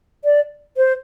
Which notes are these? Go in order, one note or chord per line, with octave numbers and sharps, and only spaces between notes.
D5
C5